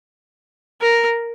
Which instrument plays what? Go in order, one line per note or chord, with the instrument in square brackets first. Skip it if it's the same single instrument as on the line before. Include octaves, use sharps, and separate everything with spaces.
[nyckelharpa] A#4